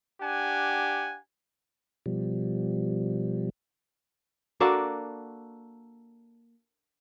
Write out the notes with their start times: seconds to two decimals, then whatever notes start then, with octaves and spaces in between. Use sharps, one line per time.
0.20 D4 G4 F#5 G#5
2.06 B2 F3 G3
4.60 A#3 D4 F#4 A4